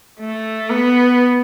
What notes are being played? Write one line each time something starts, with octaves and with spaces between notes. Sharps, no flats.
A3
B3